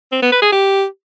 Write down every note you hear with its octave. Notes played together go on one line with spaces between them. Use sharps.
C4
B3
B4
G#4
G4